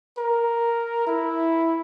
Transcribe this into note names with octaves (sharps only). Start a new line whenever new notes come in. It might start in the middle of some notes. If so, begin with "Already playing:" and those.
A#4
E4